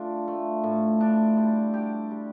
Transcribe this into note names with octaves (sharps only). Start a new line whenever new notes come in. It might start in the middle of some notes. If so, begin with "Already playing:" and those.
Already playing: A3 D4 F4
A3
A2
D4
G3
G4
G3